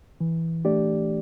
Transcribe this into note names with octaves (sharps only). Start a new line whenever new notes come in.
E3
A3 D4 G4 D5